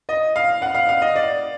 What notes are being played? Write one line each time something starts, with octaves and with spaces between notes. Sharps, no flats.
D#5
F5
F#5
F5
F5
D#5
D5